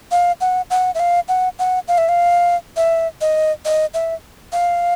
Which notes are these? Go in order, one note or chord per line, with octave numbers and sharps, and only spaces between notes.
F5
F#5
F#5
E5
F5
F#5
F#5
F5
E5
F5
E5
D#5
D#5
E5
F5